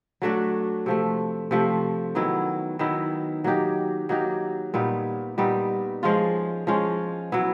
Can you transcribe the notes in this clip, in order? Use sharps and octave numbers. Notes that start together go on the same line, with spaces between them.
F#3 A3 D4 F#4
C3 F3 A3
C3 F3 A3
D#3 F#3 B3 E4
D#3 F#3 B3 E4
F#3 A#3 D#4 G4
F#3 A#3 D#4 G4
A#2 G3 B3 D#4
A#2 G3 B3 D#4
F3 G#3 C#4 F4
F3 G#3 C#4 F4
F#3 B3 E4